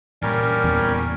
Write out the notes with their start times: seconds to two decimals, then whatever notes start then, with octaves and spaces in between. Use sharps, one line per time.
0.23 A#2 E3 G3 C#4 A#4
0.64 E2